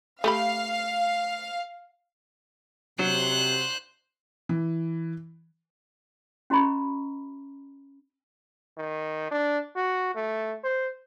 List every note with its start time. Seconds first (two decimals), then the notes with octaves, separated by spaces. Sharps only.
0.24 A3 G4 F5 B5
2.99 C3 F#3 C5 F#6
4.49 E3
6.50 C#4 F#4 D#5 A#5 B5 C#6
8.78 D#3
9.31 D4
9.76 F#4
10.15 A3
10.64 C5